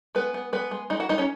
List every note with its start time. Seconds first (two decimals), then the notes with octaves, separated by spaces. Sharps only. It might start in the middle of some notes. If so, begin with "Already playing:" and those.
0.15 G#3 B3 B4
0.34 B3
0.53 G#3 B3 B4
0.71 G#3
0.90 G#3 D#4 D#5
1.00 F#4 F#5
1.09 G#3 D#4 D#5
1.18 C#4 C#5